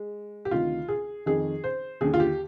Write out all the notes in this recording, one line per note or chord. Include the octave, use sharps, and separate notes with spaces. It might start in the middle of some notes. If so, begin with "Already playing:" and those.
Already playing: G#3
G4
D2 C3 D#3 F4
G#4
F2 D#3 G#4
C5
D#2 D3 G#4
F4
G4